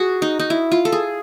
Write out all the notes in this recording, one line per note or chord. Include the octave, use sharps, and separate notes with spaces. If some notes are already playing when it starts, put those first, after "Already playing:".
Already playing: F#4 G#4
D#4
D#4
E4
F4
A4
G#4